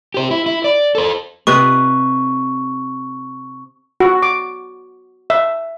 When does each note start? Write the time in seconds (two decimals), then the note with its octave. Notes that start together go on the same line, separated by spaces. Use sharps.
0.14 G4 C5
0.31 E4
0.46 E4
0.64 D5
0.95 A4 C5
1.47 C3 B4 D#5 C#6
4.00 F#4
4.23 D6
5.30 E5